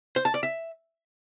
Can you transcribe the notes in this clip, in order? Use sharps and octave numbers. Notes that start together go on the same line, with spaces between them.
C5
A5
D5
E5